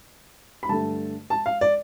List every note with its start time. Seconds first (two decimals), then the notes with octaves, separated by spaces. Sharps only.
0.63 B5
0.69 G2 D3 A3 A5
1.30 A5
1.46 F5
1.61 D5